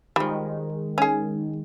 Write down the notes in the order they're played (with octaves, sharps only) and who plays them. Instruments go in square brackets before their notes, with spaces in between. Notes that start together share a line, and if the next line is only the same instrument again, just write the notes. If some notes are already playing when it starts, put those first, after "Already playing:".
[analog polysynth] D#3 G#3 [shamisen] F3 G3
[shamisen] C#4 G#4